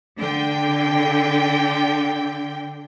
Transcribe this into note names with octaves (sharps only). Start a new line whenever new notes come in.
D3 G5